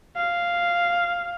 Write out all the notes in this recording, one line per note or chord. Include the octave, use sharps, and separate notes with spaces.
F5